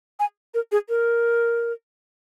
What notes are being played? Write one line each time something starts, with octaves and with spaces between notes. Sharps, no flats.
G#5
A#4
G#4
A#4